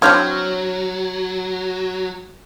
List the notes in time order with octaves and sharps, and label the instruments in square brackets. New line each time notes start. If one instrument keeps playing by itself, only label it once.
[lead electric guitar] F#3 [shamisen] C4 D4 E4 [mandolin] C#5 F6 G6